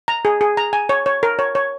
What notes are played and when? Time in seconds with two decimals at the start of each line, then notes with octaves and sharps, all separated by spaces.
0.08 A#5
0.25 G#4
0.41 G#4
0.57 A#5
0.73 G#5
0.89 C#5
1.06 C#5
1.23 A#4
1.39 C#5
1.55 C#5